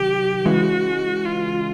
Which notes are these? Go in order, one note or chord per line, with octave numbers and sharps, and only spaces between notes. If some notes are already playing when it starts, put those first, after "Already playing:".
Already playing: C3 D#3 F#3 G4
C#3 E3 G#3 F#4
F4